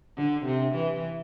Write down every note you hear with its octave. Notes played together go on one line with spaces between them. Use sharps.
D3
C3
E3